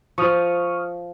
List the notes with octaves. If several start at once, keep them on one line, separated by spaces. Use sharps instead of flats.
F3 C#6 D#6 F6